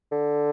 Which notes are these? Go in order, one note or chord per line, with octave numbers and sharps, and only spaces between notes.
D3